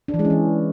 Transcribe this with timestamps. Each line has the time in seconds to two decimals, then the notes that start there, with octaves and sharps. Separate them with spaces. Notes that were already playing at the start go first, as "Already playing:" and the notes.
0.08 D4
0.14 E3
0.19 G#3
0.25 C#4
0.30 E3